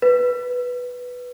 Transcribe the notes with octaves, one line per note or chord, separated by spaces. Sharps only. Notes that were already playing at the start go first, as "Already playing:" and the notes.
B4